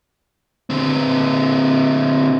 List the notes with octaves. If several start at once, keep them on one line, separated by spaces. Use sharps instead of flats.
D3 C4